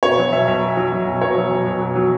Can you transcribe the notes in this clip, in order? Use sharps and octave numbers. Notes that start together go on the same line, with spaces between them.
B2 C#5
F#3
B1 E5
B1
B2
F#3
B1
B1
B2 C#5
F#3
B1
B1
B2
F#3